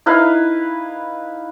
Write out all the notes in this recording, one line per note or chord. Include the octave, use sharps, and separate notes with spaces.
D#4 E4 B4 F5